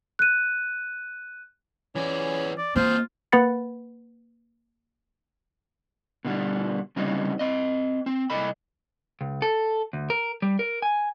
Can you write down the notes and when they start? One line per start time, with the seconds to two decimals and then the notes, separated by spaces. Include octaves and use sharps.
0.19 F#6 D#7
1.96 E3 C#4 D5
2.58 D5
2.76 A#3 C4 F4 C5 D#5
3.32 A#3 B4 F#5 B5 A6 C#7
6.25 B2 D3 G3
6.96 D2 C#3 G3 C4 D#4
7.39 C4 D#5
8.06 C4
8.30 C2 A4 D#5 B5
9.21 C#2
9.42 A4
9.93 D2
10.10 A#4
10.42 G3
10.59 A#4
10.82 G#5